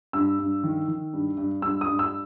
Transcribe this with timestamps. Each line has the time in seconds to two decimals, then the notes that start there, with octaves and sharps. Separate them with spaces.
0.13 G2 E6
0.39 G2
0.64 D#3
0.88 D#3
1.13 G2
1.37 G2
1.62 G2 E6
1.81 D#6
1.86 G2
1.99 E6